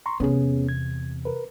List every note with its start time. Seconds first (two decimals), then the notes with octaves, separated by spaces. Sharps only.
0.06 A#5 C6 C#6
0.20 E2 C3 B3 C#4 G#4
0.69 G#6
1.25 A#4 B4